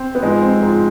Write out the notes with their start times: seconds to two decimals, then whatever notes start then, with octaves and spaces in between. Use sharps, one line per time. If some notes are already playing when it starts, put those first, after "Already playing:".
Already playing: C4
0.15 B3
0.23 G#2 F3 G#3
0.42 C4
0.62 G#2 F3